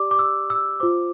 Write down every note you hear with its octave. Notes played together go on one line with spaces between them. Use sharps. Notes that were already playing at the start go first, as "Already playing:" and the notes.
Already playing: G4 D5 D6
D6
E6
E6
F4 C5 D6